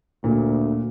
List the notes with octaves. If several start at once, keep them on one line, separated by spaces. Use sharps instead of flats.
D2 A#2